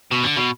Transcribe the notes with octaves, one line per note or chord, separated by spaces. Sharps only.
B2
D3
B2